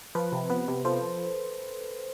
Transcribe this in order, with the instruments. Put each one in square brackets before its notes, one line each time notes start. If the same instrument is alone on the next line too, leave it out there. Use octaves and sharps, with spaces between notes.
[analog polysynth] F3 [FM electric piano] B4
[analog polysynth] C3
[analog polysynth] B3 [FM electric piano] B4
[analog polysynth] C3
[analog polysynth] F3 [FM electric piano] A4 C5